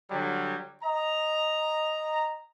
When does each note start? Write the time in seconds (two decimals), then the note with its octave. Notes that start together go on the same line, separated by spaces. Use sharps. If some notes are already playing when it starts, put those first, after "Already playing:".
0.11 D3 F#3 G3
0.83 D#5 A#5